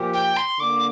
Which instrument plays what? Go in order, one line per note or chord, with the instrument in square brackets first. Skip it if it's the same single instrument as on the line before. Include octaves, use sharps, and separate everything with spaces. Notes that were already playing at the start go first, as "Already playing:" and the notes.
Already playing: [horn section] A#2 F3 A#3 G4
[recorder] G5
C6
[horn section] D3 A#3 [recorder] D6